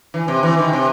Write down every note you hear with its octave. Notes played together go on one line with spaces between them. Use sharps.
E3
C3
E3
D#3
C3